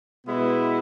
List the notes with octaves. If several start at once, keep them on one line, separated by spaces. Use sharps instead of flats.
B2 G#3 B3 E4